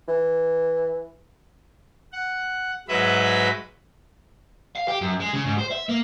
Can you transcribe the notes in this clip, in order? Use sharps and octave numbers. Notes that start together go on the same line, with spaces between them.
E3
F#5
G#2 F#3 G#3 B4 E5 B5
F5
G4
F#2
G#3
C#3
G#2
C5
E5
A#3